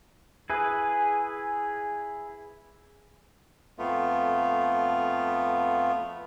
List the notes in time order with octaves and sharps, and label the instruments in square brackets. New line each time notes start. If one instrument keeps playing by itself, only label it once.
[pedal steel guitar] E4 G#4 B4
[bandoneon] F2 A3 B3 F4